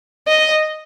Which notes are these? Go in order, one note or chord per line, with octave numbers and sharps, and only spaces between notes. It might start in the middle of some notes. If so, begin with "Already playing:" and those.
D#5